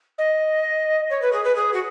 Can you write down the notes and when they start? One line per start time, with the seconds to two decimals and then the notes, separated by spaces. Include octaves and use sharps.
0.18 D#5
1.10 C#5
1.21 B4
1.32 G#4
1.44 B4
1.56 G#4
1.73 F#4